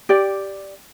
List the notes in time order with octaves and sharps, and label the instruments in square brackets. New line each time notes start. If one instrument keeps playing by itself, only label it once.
[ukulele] G4 D5